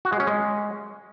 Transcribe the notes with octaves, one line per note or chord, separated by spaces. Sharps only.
F#4
G#3
C#4
G#3